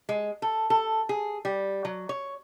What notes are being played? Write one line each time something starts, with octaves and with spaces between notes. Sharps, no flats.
G#3
A4
A4
G#4
G3
F#3
C#5